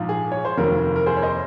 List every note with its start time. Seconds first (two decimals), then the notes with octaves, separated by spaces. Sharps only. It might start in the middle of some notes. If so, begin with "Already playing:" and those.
Already playing: A#1 G#2 F3
0.09 G#4
0.32 C#5
0.45 C5
0.57 F1 D#2 D#3 F#3 A#3 A#4
0.96 A#4
1.06 G#4 C5
1.17 C#5
1.22 C5 D#5